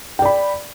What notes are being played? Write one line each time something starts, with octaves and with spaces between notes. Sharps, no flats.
D5 G5 B5